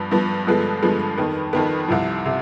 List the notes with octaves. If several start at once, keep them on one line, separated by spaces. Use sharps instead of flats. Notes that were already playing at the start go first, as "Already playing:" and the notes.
Already playing: G2 F3 B3
G2 F3 B3
G2 D3 F3 G#3 B3
G2 D3 F3 G#3 B3
F2 D#3 B3
F2 D#3 B3
C2 C3 F3
C3